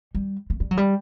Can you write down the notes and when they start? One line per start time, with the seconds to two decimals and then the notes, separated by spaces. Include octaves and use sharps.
0.15 G3
0.50 A3
0.60 G3
0.71 F#3
0.77 G3